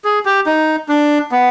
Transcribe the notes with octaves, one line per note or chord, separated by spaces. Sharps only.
G#4
G4
D#4
D4
B3